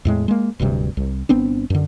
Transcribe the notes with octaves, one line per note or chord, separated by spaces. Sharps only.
E2 A2 G#3
G#3 A#3
D1 D2 G2 C3
C2
G1 B3 C4 D4
F#2 D3